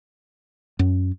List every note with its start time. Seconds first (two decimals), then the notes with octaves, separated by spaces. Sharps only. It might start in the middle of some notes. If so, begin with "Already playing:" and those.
0.79 F#2